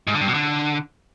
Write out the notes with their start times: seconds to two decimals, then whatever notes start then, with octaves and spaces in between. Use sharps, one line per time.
0.07 G#2
0.14 D3
0.21 G2
0.27 B2
0.34 D3